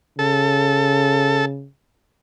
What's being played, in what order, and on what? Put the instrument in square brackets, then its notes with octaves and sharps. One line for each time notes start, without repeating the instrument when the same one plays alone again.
[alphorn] C#3 [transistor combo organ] A4